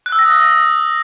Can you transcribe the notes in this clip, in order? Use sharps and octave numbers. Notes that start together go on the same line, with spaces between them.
F#6
E6
A#6
D#6
A#6